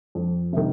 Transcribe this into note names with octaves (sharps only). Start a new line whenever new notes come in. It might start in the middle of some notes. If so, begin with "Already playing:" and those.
F2
C3 D#3